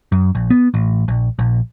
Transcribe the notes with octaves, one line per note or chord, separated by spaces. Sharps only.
F#2
A#1
B3
A1
A#1
A#1